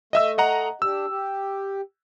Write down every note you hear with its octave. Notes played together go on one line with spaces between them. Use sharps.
A3 D#5 E5 E6
D#5 F#5 A#5
D4 G4 E6
G4